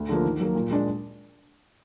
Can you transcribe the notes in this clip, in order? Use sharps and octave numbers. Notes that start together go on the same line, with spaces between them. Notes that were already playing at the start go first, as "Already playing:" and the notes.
Already playing: D2
D3 F3 A#3
D#3
F#3 A#3
A#2
G#3 D4